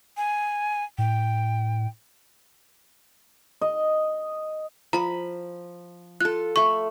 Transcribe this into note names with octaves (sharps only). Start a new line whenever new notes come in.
G#5
A2 G5
D#5
F3 A#5 B5
F4 A4 F#6
A3 B5 C#6